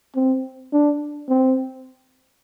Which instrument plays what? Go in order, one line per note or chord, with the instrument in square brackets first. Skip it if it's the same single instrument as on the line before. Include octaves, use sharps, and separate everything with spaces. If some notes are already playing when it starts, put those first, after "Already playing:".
[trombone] C4
D4
C4